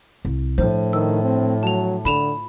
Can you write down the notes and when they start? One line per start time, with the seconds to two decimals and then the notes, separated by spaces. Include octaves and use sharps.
0.25 C2
0.58 A2 F3 D4 C5
0.93 D#3 E6
1.23 C4
1.63 F#3 A5 F7
2.05 D3 F4 B5 E7 F7